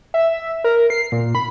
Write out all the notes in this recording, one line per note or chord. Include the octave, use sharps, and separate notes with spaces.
E5
A#4
C7
A#2
B5